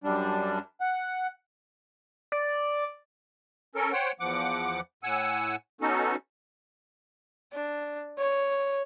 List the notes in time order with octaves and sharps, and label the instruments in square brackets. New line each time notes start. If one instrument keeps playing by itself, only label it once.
[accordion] F#2 G3 D4
F#5
[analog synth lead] D5
[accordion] C#4 A4 A#4
C5 C#5 F#5 G5
E2 F3 F#5 D6
A2 F#5 G#5 E6
B3 C#4 D#4 F#4 A4
[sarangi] D4
C#5